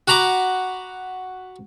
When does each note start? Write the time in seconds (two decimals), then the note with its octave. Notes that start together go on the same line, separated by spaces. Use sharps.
0.08 F#4 F#5 A#5 B5 D6